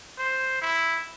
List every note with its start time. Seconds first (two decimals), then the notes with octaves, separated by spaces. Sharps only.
0.18 C5
0.62 E4